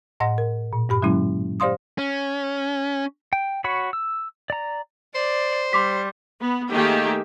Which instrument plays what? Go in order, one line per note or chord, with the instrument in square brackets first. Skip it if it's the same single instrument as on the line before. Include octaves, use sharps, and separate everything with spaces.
[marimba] A2 D#5 F#5 C6 A#6
A#4
A#2
G2 G4 B5
D3 F#3 G#3 A#3 C#4 E4
G4 C5 D5 F5 C6 D#6
[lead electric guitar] C#4
[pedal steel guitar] G5
F#4 C#5 B5
E6
D5 A#5
[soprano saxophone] C5 [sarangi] D5
[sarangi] G3 [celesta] C6 D6 B6
[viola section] B3
D#3 A3 A#3 G4 G#4 E5